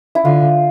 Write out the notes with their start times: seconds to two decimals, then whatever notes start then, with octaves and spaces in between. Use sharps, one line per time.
0.15 E4
0.25 D3 F4